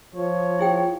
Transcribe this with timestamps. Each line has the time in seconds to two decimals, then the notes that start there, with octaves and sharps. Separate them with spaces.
0.15 F3 C#5
0.59 E4 G#4 G5